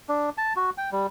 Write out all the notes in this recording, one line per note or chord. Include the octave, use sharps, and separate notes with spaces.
D4
A5
F#4
G5
G3